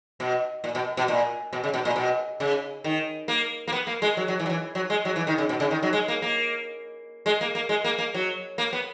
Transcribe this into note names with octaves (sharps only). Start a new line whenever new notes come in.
B2
A#2
B2
B2
A#2
B2
C#3
B2
A#2
B2
C#3
D#3
A#3
A#3
B3
A#3
G#3
F#3
F#3
E3
F#3
E3
F#3
G#3
F#3
E3
D#3
C#3
B2
C#3
D#3
F#3
G#3
A#3
A#3
G#3
A#3
A#3
G#3
A#3
A#3
F#3
A#3
B3